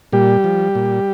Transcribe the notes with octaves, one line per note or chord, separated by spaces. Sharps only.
A#2 G3 G4
F3
A#2